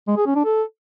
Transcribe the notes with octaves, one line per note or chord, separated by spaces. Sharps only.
G#3
G#4
C#4
D4
A4